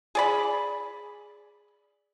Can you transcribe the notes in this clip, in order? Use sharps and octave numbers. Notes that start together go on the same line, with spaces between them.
G#4 D5 B5